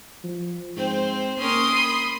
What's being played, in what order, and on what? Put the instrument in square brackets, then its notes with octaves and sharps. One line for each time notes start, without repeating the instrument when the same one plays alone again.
[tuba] F3
[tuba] G#2 [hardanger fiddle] C4 C5
[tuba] A#3 [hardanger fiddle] C#4 A#4 [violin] C6 D#6
[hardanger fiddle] B5